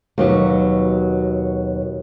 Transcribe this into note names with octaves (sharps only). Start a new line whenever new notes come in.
D#2 B2 F#3